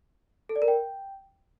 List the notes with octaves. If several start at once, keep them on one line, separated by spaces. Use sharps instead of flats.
A4
D5
A#4
G5